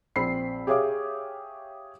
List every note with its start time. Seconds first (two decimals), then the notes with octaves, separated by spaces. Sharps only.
0.16 A#1 C4 B5 C7
0.67 G4 G#4 C#5 E5 F5 D6